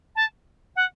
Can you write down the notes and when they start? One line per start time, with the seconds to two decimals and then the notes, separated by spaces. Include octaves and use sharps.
0.15 A5
0.75 F#5